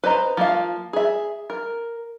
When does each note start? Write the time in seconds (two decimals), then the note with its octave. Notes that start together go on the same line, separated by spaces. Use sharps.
0.04 B4 C5 D#5 A#5
0.37 F3 A#3 F5
0.93 G#4 E5
1.50 A#4